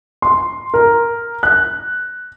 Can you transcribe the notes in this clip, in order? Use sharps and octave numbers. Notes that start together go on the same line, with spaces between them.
C6
A#4
F#6